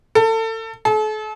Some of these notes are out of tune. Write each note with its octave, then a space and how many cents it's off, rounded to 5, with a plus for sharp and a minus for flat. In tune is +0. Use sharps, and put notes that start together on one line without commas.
A4 +30
A4 -40